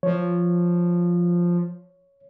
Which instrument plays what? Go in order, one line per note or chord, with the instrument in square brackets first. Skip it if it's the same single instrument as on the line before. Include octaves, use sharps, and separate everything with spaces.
[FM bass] F3 [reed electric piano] C#5